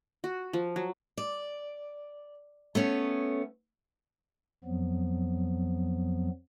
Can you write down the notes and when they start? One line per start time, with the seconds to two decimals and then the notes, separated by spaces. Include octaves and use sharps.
0.24 F#4
0.53 F3
0.76 F#3
1.17 D5
2.75 A3 B3 C#4
4.64 F2 F3 F#3 B3